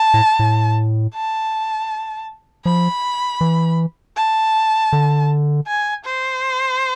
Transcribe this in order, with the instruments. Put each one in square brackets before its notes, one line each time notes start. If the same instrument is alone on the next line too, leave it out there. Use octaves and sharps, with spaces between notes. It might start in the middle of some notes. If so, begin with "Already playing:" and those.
Already playing: [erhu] A5
[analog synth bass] A2
A2
[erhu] A5
[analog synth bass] F3 [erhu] B5
[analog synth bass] E3
[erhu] A5
[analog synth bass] D3
[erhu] G#5
C5